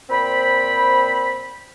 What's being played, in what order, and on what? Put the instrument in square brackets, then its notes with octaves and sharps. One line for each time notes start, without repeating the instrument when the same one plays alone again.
[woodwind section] A#2 C4 C5 G5 B5